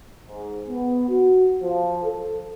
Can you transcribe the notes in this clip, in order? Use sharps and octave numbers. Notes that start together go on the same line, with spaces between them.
G#2
B3
F#4
F3
A4